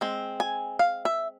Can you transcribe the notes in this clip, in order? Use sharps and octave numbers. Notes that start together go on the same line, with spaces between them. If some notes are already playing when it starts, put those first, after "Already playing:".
G#3 C4
G#5
F5
E5